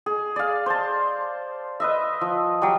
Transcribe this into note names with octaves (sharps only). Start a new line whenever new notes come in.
G#4
D5 F5
C5 A5
B4 D#5 E5
F3
F#3 G3